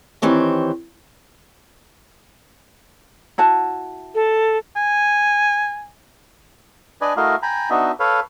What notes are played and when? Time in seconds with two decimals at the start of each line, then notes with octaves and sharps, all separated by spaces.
0.22 D#3 E3 C4 G4 C#5
3.38 E4 F#4 A5
4.15 A4
4.77 G#5
7.01 D4 B4 D5 D#5 G#5
7.17 A3 E4 F#4 A#4 D#5 F5
7.42 G5 G#5 A#5 B5
7.70 B3 D4 D#4 F#4 D#5 E5
8.00 A4 B4 C#5 F5